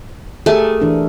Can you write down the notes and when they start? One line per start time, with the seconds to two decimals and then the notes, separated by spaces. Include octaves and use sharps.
0.46 A3 G4 G#4 A#4 G#5 A5
0.80 E3 D4 A#4